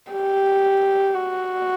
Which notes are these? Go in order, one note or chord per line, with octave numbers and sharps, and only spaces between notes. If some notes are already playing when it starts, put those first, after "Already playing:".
G4
F#4